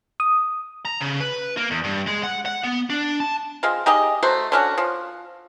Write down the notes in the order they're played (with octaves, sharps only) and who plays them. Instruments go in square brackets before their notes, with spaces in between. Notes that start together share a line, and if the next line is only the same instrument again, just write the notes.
[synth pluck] D#6
[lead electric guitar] A#5
C#3
B4
A#3
E2
G2
G#3
F#5
F#5
B3
D4
A5
[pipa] G#3 C4 F4
D#4 G4 G#4 D#5
F#3 A3 F#4 C5
D3 C#4 F#4
F3